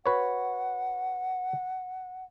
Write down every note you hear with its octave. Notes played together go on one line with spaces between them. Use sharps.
F#4 B4 C#5 F#5